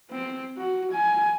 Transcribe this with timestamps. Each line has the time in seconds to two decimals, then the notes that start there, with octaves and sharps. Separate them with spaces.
0.11 C4
0.57 F#4
0.92 G#5